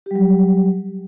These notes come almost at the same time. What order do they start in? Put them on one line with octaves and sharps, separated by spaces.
G4 G3 F#3